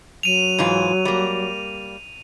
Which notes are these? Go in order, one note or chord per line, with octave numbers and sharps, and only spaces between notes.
F#3 D#7 F7
G#2 E3 F4
G3 A#3